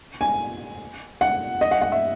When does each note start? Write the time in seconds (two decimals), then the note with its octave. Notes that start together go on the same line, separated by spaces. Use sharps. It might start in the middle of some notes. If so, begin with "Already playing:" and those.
0.21 G#5
1.21 F#5
1.61 D#5
1.71 F#5
1.82 F#5
1.92 E5